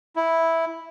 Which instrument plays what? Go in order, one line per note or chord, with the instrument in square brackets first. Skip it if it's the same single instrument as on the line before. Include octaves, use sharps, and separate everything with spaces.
[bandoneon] E4